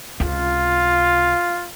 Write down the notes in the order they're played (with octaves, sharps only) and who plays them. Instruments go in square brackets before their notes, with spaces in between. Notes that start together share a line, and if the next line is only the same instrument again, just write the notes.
[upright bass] C#2 C3 [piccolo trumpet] F4